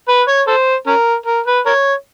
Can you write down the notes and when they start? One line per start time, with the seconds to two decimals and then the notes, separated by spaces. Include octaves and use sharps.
0.08 B4
0.28 C#5
0.47 A4 C5
0.87 C#4 A#4
1.26 A#4
1.46 B4
1.66 A#4 C#5